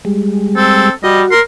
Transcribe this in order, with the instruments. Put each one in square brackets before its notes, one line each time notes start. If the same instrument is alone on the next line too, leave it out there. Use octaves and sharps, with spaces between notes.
[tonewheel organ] G3 G#3
[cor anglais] C4 [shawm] A4
[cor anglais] G3 [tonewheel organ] F#4 [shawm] D#5
[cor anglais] A#4 [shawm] C6